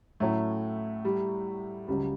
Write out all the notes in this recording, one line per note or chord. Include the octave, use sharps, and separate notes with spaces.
A2 F#3 A3 C#4 E4
G3
C#2 C#3 F#3 G3